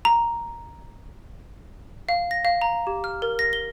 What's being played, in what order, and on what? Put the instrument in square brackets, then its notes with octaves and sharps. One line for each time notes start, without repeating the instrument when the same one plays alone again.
[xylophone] A#5
F5
A#6
F5
A#5
G4
F6
A#4
A#6
G7